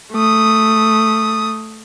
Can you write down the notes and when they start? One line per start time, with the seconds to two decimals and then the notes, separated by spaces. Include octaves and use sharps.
0.13 A3 D#6